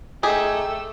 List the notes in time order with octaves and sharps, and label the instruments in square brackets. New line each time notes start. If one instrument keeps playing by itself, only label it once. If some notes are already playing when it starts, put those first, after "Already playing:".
[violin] A3 E6 [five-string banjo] D#4 G4 G#4